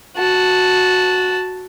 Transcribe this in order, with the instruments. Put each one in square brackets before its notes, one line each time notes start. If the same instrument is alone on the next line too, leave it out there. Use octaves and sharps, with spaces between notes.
[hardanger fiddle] F#4 A5